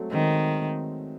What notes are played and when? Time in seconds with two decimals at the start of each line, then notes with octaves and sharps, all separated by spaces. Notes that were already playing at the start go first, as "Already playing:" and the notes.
Already playing: F#3 G#3 A3 C4
0.12 D#3 G#3 C4